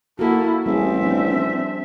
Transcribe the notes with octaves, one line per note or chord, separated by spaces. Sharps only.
A#3 E4 F#4 A4
A1 G3 A#3 C4 G#4 E5
F3 D4